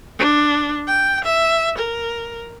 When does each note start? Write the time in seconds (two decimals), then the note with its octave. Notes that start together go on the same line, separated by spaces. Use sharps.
0.19 D4
0.88 G5
1.25 E5
1.78 A#4